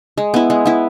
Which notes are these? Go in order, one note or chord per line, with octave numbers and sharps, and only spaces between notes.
G#3
B3 E4
G#3
B3 E4